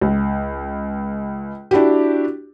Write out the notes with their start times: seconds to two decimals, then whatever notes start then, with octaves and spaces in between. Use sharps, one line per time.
0.01 C#2
1.71 D4 E4 F#4 G4